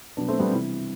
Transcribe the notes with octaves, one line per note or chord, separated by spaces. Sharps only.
B2 F#3 B3 D4
A3 C4
G3 B3
C3 E3